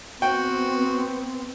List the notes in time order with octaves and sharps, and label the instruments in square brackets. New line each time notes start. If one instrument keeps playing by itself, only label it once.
[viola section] B3 C4 [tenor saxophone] F#4 [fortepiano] G5